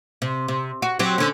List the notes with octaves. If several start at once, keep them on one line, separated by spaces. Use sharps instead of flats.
C3
C3
F#4
F#3 C4 G4
D3 C#4